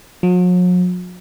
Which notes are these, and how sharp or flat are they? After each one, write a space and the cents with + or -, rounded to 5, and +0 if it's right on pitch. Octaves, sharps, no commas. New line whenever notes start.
F#3 -45